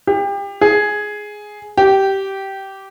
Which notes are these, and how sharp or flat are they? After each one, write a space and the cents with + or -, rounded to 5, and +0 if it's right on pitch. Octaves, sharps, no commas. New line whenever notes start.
G4 +30
G#4 +5
G4 -15